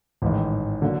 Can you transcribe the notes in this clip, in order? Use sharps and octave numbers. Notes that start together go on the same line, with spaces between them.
A1 G#2 D#3
D3 F#3 A#3